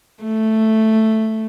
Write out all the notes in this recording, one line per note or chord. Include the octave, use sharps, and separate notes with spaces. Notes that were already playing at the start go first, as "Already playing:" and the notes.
A3